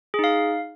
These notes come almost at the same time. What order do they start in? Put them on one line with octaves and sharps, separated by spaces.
G#4 D#4 F5